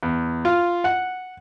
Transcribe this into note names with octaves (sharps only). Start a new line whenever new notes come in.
E2
F4
F#5